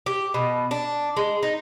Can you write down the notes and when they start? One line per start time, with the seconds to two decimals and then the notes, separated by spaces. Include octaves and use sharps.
0.06 G4
0.34 B2
0.71 D4
1.17 G#3
1.43 D#4